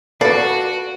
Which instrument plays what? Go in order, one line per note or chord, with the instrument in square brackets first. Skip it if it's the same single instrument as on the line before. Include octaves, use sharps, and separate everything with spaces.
[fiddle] F#4 [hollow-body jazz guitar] A4 B4 F5 [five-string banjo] D5